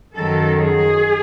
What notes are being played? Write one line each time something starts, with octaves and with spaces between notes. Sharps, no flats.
F#2 D#3 F#3 A4
G#4